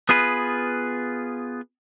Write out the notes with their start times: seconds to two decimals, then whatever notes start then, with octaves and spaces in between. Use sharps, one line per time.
0.09 B3 F4 G#4 B4